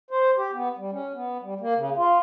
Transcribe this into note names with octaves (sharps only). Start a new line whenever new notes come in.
C5
G4
B3
G3
C#4
B3
G3
A#3
C#3
F4